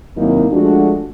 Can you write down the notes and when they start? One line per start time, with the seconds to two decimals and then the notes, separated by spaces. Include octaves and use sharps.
0.16 D#2 C3 F#3 A#3 D#4 E4
0.51 F3 G#3 A3 D4 F#4